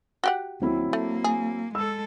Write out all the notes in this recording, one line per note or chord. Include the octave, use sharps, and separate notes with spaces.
F#4 G4 F#5
D#2 F#3 C4 E4
A3 A#3
G#4
G#3 A4 E6